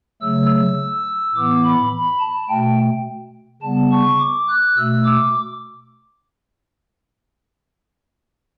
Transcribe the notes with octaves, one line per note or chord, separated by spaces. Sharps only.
C#3 F#3 A3 E6
E6
A2 E3 B3 D6
B5
B5
A5
B2 A3 G5
C#3 G3 B3 A5
C#6
D6
F#6
B2 A3 E6
D6